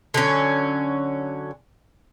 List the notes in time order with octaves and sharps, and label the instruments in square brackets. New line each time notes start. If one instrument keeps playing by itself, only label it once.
[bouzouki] D3 F#3 C#4